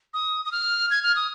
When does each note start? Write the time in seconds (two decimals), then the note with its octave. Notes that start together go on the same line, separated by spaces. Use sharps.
0.14 D#6
0.45 D#6
0.52 F6
0.91 G#6
1.03 F6
1.16 D#6